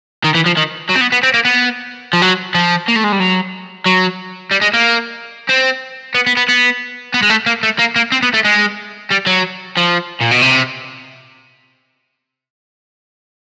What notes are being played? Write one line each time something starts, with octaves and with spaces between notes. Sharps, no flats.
D#3
E3
F3
D#3
F#3
C4
B3
B3
C4
A#3
B3
F3
F#3
F3
A#3
A3
G#3
G3
F#3
F#3
G3
G#3
A#3
C4
B3
B3
B3
B3
B3
G#3
A3
A#3
A3
A#3
A#3
C4
B3
A3
G#3
G3
F#3
F3
A#2
B2
C3